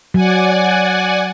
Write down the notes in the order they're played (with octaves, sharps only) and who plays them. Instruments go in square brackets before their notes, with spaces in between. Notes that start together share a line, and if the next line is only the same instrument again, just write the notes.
[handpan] F#3 [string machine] D5 F#5 G#5